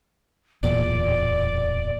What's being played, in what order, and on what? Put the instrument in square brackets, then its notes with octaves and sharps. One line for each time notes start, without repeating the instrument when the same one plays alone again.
[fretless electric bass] D1 E2 A#2 [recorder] D5